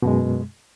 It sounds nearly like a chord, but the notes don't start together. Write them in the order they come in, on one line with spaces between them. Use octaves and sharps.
B2 F#2 G#3